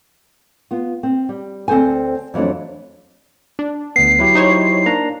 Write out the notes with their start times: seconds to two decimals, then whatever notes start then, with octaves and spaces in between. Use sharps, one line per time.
0.71 B3 F4
1.03 C4
1.29 G3
1.68 D2 C4 A4 C5 G#5
2.34 F2 E3 F#3 A3 D4
3.59 D4
3.96 D2 B3 C7
4.19 F#3 E4 G4
4.35 D#4 C5 C#5
4.86 A#3 D4 A#5